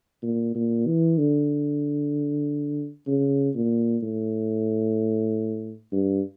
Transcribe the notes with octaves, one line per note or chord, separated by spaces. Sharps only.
A#2
A#2
E3
D3
C#3
A#2
A2
G2